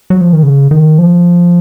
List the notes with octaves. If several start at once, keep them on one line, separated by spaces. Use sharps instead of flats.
F#3
F3
D#3
C#3
D#3
F3